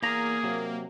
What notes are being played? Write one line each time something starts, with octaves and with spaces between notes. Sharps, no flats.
E2 A#3 G#4 A#5
C3 F#3